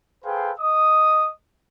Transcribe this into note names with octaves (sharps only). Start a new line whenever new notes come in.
G#4 A4 B4 C5 F5 G5
D#5 D#6